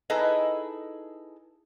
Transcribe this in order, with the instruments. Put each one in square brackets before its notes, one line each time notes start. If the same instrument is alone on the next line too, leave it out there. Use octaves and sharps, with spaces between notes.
[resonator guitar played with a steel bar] D#4 E4 G#4 A4 B4 D#5